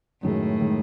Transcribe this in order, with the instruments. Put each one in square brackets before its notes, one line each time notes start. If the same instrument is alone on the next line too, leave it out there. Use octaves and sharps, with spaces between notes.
[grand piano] F#2 D#3 G#3 [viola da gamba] A2
[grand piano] D#3 G#3